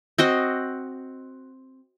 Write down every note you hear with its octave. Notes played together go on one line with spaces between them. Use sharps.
C4 F#4 D#5